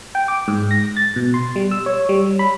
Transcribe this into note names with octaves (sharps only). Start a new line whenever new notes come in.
G5
D6
G#2
A#6
A6
B2
C6
G3
E6
C#5
G3
B5